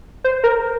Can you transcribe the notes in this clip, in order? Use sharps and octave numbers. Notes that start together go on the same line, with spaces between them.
C5
A#4